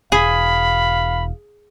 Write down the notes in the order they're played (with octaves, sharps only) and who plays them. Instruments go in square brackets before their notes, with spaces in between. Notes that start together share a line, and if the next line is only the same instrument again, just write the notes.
[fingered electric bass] E1 [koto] G#4 [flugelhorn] F5 [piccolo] B5